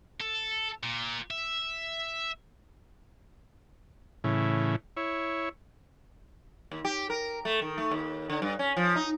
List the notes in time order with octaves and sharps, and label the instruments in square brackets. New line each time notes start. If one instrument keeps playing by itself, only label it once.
[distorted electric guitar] A4
A#2
E5
[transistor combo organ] A2 C#3 E3
E4 C#5
[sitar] D#2
G4
A#4
A3
D#3
A3
D#2
D3
G2
C#4
F3
D#4